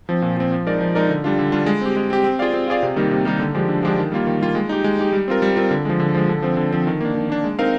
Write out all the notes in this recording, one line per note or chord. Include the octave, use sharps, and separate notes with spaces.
F3 C4
A#2
F3 C4
F3
G#3 D#4 A#4 D5
F3
G#3 D#4 A#4 D5
D3
G3 D4 F4
D3
G3 D4 F4
G#3
C4 G4
G#3
C4 G4
C4
F4 G#4 D5 F5
C4
F4 G#4 D5 F5
C3
D#3 G3 A#3 D#4
C3
D#3 G3 A#3 D#4
D3
F3 G#3 D4 G4
D3
F3 G#3 D4 G4
D#3
G3 A#3 F4
D#3
G3 A#3 F4
G#3
D#4 G4
G#3
D#4 G4
G3
C4 F4 A#4
G3
C4 F4 A#4
D3
F3 G#3
D3
F3 G#3
D3
F3 C4
D3
F3 C4
D#3
A#3 D4
D#3
A#3 D4
G#3
C4 D#4 A#4 F5